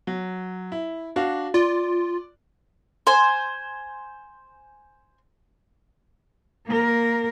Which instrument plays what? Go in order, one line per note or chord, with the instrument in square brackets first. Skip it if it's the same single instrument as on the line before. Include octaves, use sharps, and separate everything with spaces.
[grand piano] F#3
E4
D4 F#4 F5
[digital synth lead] F4 [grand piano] D5
[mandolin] C5 G#5
[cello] A#3 A#4